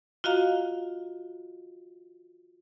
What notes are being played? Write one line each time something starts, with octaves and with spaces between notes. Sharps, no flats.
F4 F#4 D#5 F5 A#5